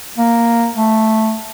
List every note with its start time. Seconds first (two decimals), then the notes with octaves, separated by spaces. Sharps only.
0.18 A#3
0.76 A3